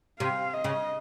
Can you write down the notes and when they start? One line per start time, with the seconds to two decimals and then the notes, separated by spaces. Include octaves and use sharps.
0.20 C3 F5
0.53 D#5
0.64 C#3